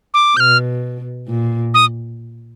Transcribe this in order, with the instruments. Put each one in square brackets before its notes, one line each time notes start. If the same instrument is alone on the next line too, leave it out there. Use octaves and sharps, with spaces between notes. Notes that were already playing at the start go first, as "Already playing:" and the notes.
[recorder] D6
[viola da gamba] B2 [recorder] F6 G6
[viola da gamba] A#2
[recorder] D#6